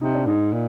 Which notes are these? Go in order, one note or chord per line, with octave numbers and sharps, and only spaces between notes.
C3 D#4
D4
G#2 D#4
A#2